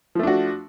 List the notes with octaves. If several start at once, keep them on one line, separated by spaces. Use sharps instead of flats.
F3 A3 D4 F#4